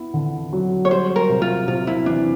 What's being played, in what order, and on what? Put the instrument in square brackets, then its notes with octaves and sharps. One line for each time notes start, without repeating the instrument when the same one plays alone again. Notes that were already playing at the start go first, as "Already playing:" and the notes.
Already playing: [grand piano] B3 E4
D3
F#3
[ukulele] C#5
[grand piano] G3 [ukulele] C5
[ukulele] A#4
[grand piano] C3
[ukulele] F4
[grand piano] C3 [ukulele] F4
[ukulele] E4
[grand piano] E3 [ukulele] D4